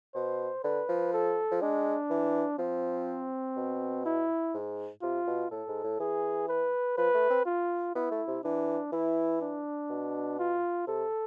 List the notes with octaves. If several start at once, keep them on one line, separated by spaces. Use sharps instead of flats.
B2 C5
D3 B4
F3
A4
F3
G#3 D4
E3
F3 C4
B2
E4
G#2
C3 F4
B2
A2 A4
G#2
A2
E3 G#4
B4
F3 B4
A3
C4
F4
B3 E4
A3
C3
E3 D4
E3 E4
D4
B2
F4
C3 A4